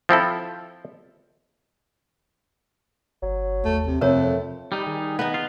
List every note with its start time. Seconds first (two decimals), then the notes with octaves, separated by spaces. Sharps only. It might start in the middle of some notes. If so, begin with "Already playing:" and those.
0.09 F3 C4 E4 A4
3.22 G1 F#3
3.65 D#2 A3
3.87 C3
4.01 F2 C3 A3 A#4 C#5
4.72 G3 D#4 G4 B5
4.87 D#3 G#4
5.19 B3 D#4
5.34 F4